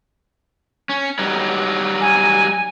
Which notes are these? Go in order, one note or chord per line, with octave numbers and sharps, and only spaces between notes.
C#4
F#3 G3 D#4
G#5